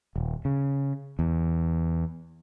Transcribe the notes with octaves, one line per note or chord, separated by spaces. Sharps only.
D#1
C#3
E2